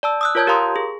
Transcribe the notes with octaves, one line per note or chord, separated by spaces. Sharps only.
D5 A5 E6
D#6 E6 F#6
F4 A#4 C#5 A5 G6 G#6
G4 A#4 F5 A#5 C6 D#6
G#4